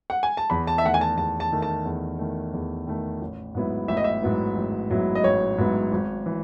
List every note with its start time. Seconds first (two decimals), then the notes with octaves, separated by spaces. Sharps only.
0.10 F#5
0.23 G#5
0.37 A5
0.50 E2 B5
0.67 A5
0.78 E5
0.83 D#3 A3 F#5
0.94 G#5
1.01 A5
1.17 E2 A5
1.40 A5
1.52 D#3 A3
1.62 A5
1.85 E2
2.19 D#3 A3
2.54 E2
2.87 D#3 A3
3.22 A1
3.55 G#2 F#3 B3 E4
3.88 A1 E5
3.97 D#5
4.04 E5
4.22 G#2 F#3 B3 E4
4.56 A1
4.90 G#2 F#3 B3 E4
5.15 D#5
5.24 A1 C#5
5.58 G#2 F#3 B3 E4
5.92 G#1
6.26 E3